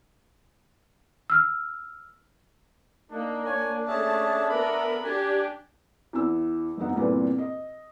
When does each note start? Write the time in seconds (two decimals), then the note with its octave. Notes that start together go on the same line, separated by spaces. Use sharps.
1.30 E6 F6
3.12 A#3 D4 D#4
3.46 C#5 G#5
3.88 A3 C#4 G#4 E5 A5
4.49 B3 A#4 B5
5.04 D4 G4 G#5
6.13 E2 E4 E6
6.77 F#1 G#2 B3 D#4 F#5
6.96 E2 G2 A#2 C4 A4 B4
7.38 D#5